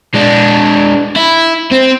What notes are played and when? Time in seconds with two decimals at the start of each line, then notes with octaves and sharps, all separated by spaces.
0.14 G#3 D4
1.16 E4
1.71 C4